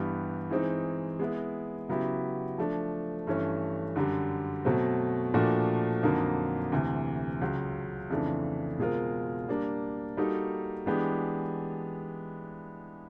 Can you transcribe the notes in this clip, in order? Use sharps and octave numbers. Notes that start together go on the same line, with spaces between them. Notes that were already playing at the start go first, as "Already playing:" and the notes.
Already playing: G2 E3 G3 B3
E3 G#3 C4 D#4
G#3 B3 E4
C#3 F#3 B3 E4 G4
F3 A3 D4
G2 E3 A3 C#4
F#2 D3 G3
B2 F#3 A3 C4
A#2 F3 A3 D4 F#4
F2 D3 F#3 A#3 D#4
D2 C3 E3
C#2 C#3 F#3
F2 C#3 E3 A3 D4
B2 G#3 C4 F4 A#4
G3 A#3 D4
G3 A#3 D#4 F#4 A4
E3 G#3 B3 D4 G4